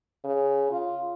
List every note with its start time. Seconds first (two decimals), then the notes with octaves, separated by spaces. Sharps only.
0.24 C#3
0.71 F4